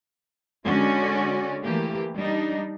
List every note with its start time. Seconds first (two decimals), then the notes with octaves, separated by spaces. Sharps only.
0.64 D3 G#3 C#4 F#4 D5
1.62 E3 A3 A#3 G4
2.15 G3 D4 D#4